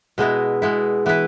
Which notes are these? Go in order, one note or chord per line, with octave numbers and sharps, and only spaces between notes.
B2 G#3 B3 E4
B2 G#3 B3 E4
E3 B3 E4 B4